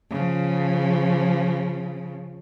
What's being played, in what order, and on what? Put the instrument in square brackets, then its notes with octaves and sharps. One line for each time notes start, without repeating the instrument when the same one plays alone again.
[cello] C#3 F3